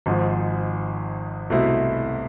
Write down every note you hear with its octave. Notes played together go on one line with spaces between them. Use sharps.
G#1 G#2 F3
C2 B2 A3 C4 E4